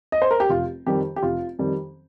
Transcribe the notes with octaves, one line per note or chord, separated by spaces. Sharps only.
D#5
C5
A#4
G4
F1 F4
F2 D#3 G3 G4
G4
F1 F4
F2 D#3 G3